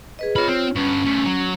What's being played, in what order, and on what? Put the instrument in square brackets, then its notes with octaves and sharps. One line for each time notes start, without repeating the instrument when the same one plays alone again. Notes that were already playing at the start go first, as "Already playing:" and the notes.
[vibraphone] G#4 B4 D#5
[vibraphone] F4 C#5 [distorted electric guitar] D#5 B5
[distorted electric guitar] C4
[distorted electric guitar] G2 B3 [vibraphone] C#4
[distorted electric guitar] C#3 A3
F#3